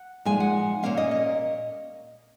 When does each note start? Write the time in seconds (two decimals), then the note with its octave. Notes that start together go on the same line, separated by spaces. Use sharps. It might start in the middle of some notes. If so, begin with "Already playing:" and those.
Already playing: F#5
0.25 A#2 F3 G#3 D#4 G#5
0.40 F#5
0.83 A#2 F3 A#3 C#4 F5
0.97 D#5
1.11 D#5